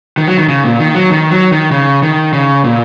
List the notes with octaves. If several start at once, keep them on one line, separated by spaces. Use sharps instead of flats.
D#3
F#3
D#3
C#3
A#2
D#3
F#3
D#3
F#3
D#3
C#3
D#3
C#3
A#2